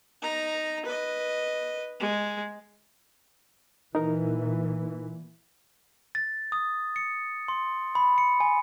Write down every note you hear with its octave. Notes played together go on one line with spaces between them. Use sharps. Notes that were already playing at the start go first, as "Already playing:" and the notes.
D#4 A#5
B4 D#5
G#3
A#2 E3 D#4 A#4
A6
D#6
C#7
C6
B5
C#7
G#5